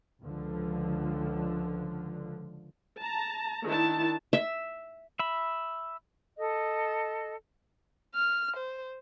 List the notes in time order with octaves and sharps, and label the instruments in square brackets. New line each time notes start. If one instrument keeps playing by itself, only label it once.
[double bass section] C#2 D3 F3
[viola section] A5 A#5
D#3 D4 E4 A5
[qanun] E5
[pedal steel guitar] E5 B5
[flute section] A4 D#5
[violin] F6
C5